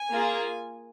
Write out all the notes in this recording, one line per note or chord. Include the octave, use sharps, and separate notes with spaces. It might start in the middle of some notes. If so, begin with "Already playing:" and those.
Already playing: G#5
A#3 F4 G#4